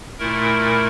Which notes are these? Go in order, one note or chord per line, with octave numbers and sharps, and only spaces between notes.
A#2 A3 E4 A#4